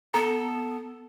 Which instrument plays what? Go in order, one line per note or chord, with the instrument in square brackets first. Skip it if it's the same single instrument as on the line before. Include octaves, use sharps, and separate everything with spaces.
[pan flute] B3 [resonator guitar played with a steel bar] A4 [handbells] A#5